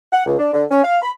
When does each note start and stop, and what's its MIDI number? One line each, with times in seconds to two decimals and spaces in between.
0.13 0.25 78
0.26 0.38 37
0.39 0.50 62
0.53 0.64 50
0.71 0.82 61
0.84 0.97 77
1.02 1.10 83